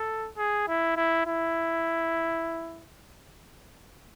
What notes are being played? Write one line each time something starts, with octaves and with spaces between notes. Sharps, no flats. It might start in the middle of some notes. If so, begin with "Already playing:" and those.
Already playing: A4
G#4
E4
E4
E4